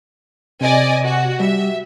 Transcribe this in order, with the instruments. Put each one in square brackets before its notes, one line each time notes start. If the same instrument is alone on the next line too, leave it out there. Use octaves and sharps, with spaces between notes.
[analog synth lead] C3 [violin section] D5 D#5 G#5
[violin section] F#4
[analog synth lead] G3 [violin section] E5